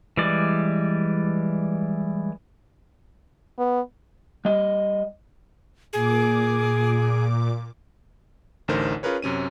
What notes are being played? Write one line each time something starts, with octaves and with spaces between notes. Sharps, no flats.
E3 G3 G#3 D5
B3
G3 D#5
A#2 G#4 D6
A1 D2 D3 D#4 A#4 C5
C#4 F4 G#4 A#4 B4 C#5
F#2 C3 C#4 D#7